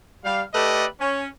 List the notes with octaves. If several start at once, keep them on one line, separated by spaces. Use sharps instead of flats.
G3 F5
A3 G4 A4 B4 D5 D#5
C#4